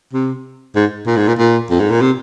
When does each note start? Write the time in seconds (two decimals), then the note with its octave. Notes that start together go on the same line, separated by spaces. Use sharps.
0.13 C3
0.75 G#2
1.06 A#2
1.16 G#2
1.28 A#2
1.38 A#2
1.70 F2
1.80 G#2
1.90 A#2
2.01 C3